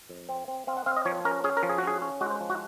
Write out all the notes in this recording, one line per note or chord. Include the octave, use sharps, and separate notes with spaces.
F2
C4
C4
C4 F5
F#5
C4 F5
D#5
F3 C#5
C#4 A#4
C#4 G#4
A#4
F3
G#4
F#4
C#4 G#4
C#4
G#3 F#4
C5
F3
F#4